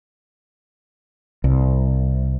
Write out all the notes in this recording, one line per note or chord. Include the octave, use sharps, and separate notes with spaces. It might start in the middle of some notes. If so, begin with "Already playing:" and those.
C2